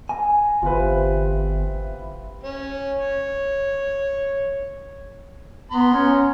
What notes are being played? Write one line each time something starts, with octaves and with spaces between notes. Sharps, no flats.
G#5 A#5
G1 C3 E3 F4 B4
C#4
C#5
B3 A#5 C6
C#4